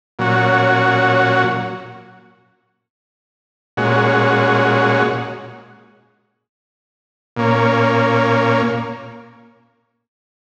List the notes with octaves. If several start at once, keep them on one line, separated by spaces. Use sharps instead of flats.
A#2 F#3 C#4 F#4
A#2 G#3 C#4 F#4
A#2 A#3 C#4